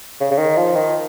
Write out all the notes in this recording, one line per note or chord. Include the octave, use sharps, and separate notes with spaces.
C#3
C#3
D#3
F3
D#3